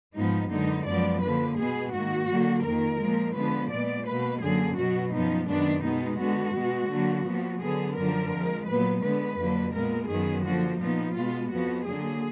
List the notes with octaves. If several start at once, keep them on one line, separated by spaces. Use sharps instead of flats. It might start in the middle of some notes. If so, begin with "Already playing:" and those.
G#2 F3 B3 D#4
F#2 D3 G#3 B3 D#4
F#2 F3 G#3 B3 D5
D3 F3 A#3 B4
B2 G#3 B3 G#4
G#2 D#3 A#3 F#4
D3 F#3 A#3
F2 D#3 A#3 A#4
A#2 F3 G#3
D3 F3 G#3 B3 B4
A#2 G#3 B3 D5
B2 A#3 B4
F#2 D3 F#3 A#3 G#4
B2 F#3 B3 F#4
F#2 F3 B3 D#4
F#2 D#3 G#3 B3 D4
B2 G#3 B3 D#4
D3 G#3 B3 F#4
B2 G#3 B3
D3 F#3 A#3
A#2 F3 B3
D3 F#3 B3 G#4
F#2 D3 F3 A#4
F2 F3 G#3
A#2 F#3 B3 B4
D3 G#3 B3 B4
F2 D3 F#3 A#3
A#2 G#3 B3 A#4
F#2 D#3 F#3 B3 G#4
D3 F3 A#3 F#4
A#2 F3 B3 D#4
B2 G#3 B3 F4
F2 F3 B3 F#4
D3 F#3 A#3 G#4